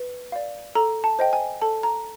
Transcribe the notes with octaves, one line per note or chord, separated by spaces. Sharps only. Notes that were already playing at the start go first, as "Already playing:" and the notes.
Already playing: B4
D5 F5
A4 A#5
A5
C5 D#5 G5
G#5
A4 A5
A#5